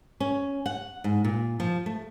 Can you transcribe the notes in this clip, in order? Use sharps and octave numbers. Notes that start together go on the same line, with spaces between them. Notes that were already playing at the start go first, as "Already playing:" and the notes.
C#4
F#5
G#2
A#2
F3
A3